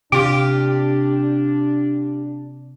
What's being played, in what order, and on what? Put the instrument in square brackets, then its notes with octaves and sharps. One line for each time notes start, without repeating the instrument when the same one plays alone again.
[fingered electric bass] C3 [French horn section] D4 [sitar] F4 G4 [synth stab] D6